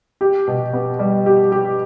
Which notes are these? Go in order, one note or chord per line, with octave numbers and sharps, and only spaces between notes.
G4
B2
B3
G3
G4
G4